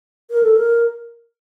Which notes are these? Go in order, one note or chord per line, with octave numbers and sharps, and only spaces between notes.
A#4
A4
A#4